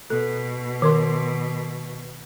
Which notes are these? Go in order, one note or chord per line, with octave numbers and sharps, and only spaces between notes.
B2 A4
D#3 A#4 C6